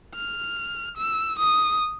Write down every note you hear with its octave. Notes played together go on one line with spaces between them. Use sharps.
F6
E6
D#6